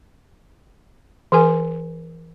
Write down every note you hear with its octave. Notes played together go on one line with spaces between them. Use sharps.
E3 G#4 A#4 G#5